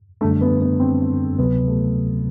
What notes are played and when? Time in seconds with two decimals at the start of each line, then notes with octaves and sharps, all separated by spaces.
0.21 F#2 D3 G3 A3 D4
0.41 B3
0.61 B3
0.80 C4
1.38 D2 C3 F#3 B3
1.68 A3